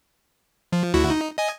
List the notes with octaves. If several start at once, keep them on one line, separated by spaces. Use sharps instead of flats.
F3
D2 E4 F#4
D#4
D#5 G#5